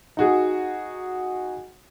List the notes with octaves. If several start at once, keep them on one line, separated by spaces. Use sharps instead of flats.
D#4 F#4 G#4